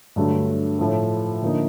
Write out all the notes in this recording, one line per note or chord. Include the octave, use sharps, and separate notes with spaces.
G2 D3 F#3 A3
A2 F3 A3
D3 F3 A#3 D#4